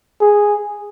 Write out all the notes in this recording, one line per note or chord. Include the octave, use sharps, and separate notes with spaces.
G#4